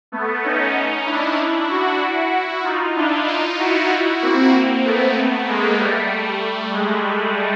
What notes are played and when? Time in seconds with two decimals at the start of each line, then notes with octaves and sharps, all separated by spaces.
0.12 A3 B3
0.44 C#4 D#4
1.06 D4 E4
1.70 E4 F#4
2.01 E4 F#4
2.64 D#4 F4
2.96 D4 E4
3.28 D#4 F4
3.59 E4 F#4
4.22 A#3 C4
4.85 A3 B3
5.48 G#3 A#3
5.79 G3 A3
6.73 G#3